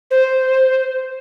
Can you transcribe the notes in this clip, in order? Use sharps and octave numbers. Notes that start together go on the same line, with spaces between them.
C5